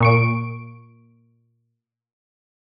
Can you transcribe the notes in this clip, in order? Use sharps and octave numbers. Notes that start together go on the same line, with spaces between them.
A#2 C#6 D7